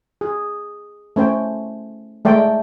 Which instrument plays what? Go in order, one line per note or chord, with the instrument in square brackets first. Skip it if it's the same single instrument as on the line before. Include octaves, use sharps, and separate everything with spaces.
[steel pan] G#4
A3 C#4 C5 G5
G#3 A3 D5 G5